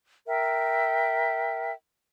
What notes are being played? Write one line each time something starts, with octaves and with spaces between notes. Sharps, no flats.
A#4 E5 G5